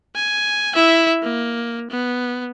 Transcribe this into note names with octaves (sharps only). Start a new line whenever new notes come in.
G#5
E4 E5
A#3
B3